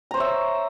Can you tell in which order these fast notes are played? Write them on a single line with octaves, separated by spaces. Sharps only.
A#5 C5 C#5 E5